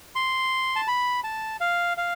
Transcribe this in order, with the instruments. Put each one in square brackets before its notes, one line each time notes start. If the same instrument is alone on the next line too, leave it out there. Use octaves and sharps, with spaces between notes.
[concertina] C6
A5
B5
A5
F5
F5